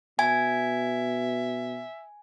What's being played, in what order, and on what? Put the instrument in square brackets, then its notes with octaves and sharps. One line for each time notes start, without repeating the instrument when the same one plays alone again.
[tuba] B2 [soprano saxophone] E5 [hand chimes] G#5